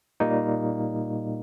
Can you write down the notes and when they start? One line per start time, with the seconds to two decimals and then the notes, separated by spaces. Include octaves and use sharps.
0.20 A#2 G3 A#3 D#4